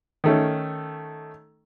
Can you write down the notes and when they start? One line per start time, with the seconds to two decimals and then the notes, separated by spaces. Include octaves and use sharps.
0.24 D#3 A3 C#4